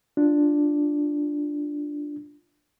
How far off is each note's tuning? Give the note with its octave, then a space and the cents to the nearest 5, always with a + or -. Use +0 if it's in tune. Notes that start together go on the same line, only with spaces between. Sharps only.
D4 +0 F4 +0